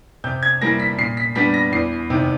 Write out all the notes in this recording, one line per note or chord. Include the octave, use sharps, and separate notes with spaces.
C3 G6
G#6
E3 G3 A#3 A#6
B6
A#2 C7
B6
G3 B3 D4 B6
A#6
E2 C7
C3 D#3